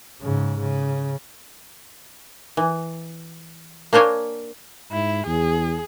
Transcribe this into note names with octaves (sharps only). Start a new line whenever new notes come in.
G#2 C#3
C#3
E3
A#3 D4 C5 C#5 G#5
G#2 E4
E2 G#4